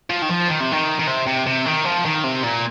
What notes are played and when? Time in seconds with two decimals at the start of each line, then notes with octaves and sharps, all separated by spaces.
0.10 F3
0.22 D#3
0.29 F3
0.49 D#3
0.61 C3
0.72 D#3
0.99 D#3
1.07 C3
1.27 C3
1.47 C3
1.66 D#3
1.85 F3
2.05 D#3
2.24 C3
2.44 A#2